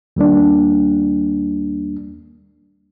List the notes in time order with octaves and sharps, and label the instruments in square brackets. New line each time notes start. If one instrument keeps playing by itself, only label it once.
[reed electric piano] D#2 G3 A#3 D4